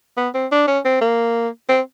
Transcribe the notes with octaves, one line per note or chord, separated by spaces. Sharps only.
B3
C4
D4
C#4
C4
A#3
C4